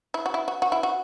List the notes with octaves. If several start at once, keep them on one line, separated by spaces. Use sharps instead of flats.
E4
F#4
E4
F#4
F#4
E4
F#4